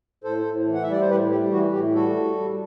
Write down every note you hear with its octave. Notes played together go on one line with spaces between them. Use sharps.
A2 A4 C5
A2
E3
F#5
E5
G3 D5
C5
A2 G4 B4
G3 G4
E3 F#4
A2 G4
G3 F#4 A4
G3
G3